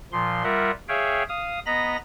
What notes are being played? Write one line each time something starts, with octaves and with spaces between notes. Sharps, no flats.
A#2 F3 C6
G3 F4 A#4 E5 F#5
G#4 C#5 E5 F5 G5
F5 D#6
B3 D#5 A#5 B5 A#6